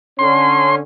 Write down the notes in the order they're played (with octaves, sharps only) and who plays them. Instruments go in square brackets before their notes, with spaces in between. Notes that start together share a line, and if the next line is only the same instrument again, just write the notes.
[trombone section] D3 C#4 [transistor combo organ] C6